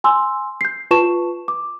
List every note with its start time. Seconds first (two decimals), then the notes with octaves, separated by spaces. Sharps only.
0.04 G#5 C6 E6
0.61 G6 C7
0.91 F4 B4 A5 C#6 E7
1.48 D6